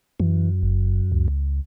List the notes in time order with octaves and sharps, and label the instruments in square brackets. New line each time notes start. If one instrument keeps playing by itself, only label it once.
[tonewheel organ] F#2 [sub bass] E3
[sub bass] F#1
C#2